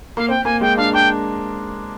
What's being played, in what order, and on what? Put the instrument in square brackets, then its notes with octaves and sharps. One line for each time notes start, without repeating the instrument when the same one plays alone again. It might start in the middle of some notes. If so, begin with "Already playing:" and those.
[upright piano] A#3 [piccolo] F5
[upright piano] C4 [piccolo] G5
[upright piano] A#3 [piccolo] G#5
[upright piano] G#3 [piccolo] G5
[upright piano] D4 [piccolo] F5
[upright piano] D4 [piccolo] G5